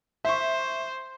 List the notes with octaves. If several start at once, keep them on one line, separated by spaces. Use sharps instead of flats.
C5 E5 C#6